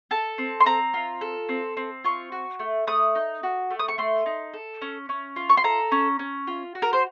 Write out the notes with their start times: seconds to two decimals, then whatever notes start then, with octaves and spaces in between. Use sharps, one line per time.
0.11 A4 A5
0.38 C4
0.60 C6
0.66 C4 A#5
0.94 F4
1.21 A4
1.49 C4
1.77 C4
2.04 F4 C#6
2.32 F#4
2.59 A3
2.87 A3 D#6
3.15 D#4
3.43 F#4
3.71 A3
3.79 D#6
3.88 C#6
3.98 A3 C6
4.26 D#4
4.54 A4
4.82 C#4
5.09 C#4
5.36 F4
5.49 C#6
5.57 C6
5.64 A4 A#5
5.92 C#4
6.19 C#4
6.47 F4
6.75 F#4
6.82 A#4
6.93 C5